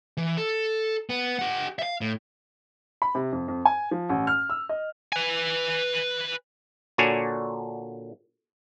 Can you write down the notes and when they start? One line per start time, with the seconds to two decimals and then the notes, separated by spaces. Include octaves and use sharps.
0.17 E3
0.37 A4
1.10 B3
1.39 G4 F#5
1.79 E5 F5
2.01 A2
3.02 B5
3.15 C3
3.32 F2
3.48 F2
3.65 G#5
3.91 F3
4.09 A1
4.27 F6
4.50 E6
4.69 D#5
5.13 B4 G#5
6.98 A#2 D3 D4 F#4 C#5 G#5